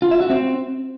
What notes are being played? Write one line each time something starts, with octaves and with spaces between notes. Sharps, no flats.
F4
E5
F#4
C4